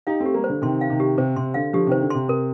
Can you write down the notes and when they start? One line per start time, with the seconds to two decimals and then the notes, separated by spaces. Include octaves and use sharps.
0.07 D#4 G4 F5
0.20 A3 C4
0.26 G4
0.34 G3 A#3
0.44 C5
0.49 D3
0.62 C3 D#3 C6
0.81 F5
0.90 C3 D#3
1.00 G4
1.18 C3 C5
1.36 C3 C6
1.54 D3 F5
1.73 D3 F3 G4
1.87 C3 D#3 C5
2.01 D3
2.10 C3 C6
2.28 C3 A#4